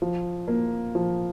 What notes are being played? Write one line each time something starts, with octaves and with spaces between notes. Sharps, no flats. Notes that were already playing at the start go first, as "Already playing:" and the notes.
F3
A#3
F3